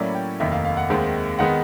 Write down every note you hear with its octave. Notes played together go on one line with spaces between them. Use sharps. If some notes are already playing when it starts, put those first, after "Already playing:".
Already playing: A2 F#3 A#3 C#4 E4 D5
G5
F1 D#2 D#3 E5
F5
F5
F#5
D#2 D#3 G#3 C4
D#3 G#3 B3 F#5